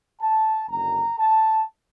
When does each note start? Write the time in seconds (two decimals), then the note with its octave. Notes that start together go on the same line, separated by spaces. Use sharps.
0.21 A5
0.69 F#1 F#2 D3 A#5
1.18 A5